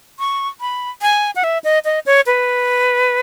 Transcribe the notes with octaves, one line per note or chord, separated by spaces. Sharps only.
C#6
B5
G#5
F#5
E5
D#5
D#5
C#5
B4